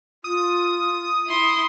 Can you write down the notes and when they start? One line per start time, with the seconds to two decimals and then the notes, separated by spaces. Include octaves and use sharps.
0.24 F4 D#6
1.27 E4 C6